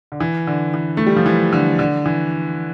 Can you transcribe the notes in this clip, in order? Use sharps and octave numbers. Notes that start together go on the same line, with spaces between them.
D3
E3
D3
E3
A3
G3
F3
E3
D3
D3
E3